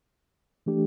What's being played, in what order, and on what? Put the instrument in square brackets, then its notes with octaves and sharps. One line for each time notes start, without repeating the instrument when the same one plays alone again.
[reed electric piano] E3 A3 D4 G4